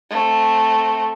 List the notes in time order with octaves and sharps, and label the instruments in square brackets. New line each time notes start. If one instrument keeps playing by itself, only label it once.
[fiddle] A3 C4